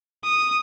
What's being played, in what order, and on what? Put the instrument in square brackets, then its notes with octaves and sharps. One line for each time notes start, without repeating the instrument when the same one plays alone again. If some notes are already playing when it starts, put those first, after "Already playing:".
[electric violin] D#6